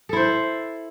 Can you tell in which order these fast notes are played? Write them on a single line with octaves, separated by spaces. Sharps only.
A4 E4 C5